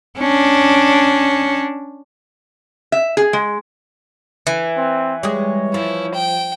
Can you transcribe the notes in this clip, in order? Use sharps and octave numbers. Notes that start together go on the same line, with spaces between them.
C#4 D4
E5
G#4
G#3
E3
C4
G3 G#3 G#4 C#5
F3 E4
G5